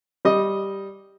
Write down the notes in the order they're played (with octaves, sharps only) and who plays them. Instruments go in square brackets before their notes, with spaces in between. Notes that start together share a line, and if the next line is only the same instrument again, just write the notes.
[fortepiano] G3 D#5